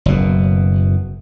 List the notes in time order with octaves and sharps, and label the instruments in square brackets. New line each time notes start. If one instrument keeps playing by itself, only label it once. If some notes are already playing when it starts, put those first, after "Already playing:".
[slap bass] F#1 B2